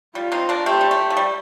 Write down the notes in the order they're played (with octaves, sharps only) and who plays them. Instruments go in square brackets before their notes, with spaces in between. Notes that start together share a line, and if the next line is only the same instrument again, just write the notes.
[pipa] G3 [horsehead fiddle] F4
[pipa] C4 D#4
A#3 D4
[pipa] A3 C4 [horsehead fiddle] G4
[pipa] G3
A3
F3
G3